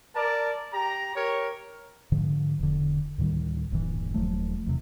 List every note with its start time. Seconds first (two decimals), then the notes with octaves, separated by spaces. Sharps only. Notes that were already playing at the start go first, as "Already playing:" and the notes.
0.16 A#4 D5 A5
0.74 G4 A#5
1.15 G4 A#4 C#5
2.12 G#2 D3 F3
2.59 E1 D3
3.18 D2 A2 D#3 G3
3.71 D1 A#1 G2 E3
4.14 D#1 F3 F#3 A3
4.67 E2 C3